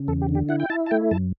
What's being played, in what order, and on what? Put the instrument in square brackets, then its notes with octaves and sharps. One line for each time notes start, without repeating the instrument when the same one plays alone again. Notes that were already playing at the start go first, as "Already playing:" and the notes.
Already playing: [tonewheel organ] C#3
E2 A4
G4
D3
G4
E4 F#5
G5
E4 A5
A5
A3 G5
F#2 A5